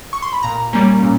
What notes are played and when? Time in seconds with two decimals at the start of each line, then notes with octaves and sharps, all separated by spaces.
0.13 C#6
0.22 C6
0.33 B5
0.43 A#2 A#5
0.73 G3 A#3 C#4
1.03 A#2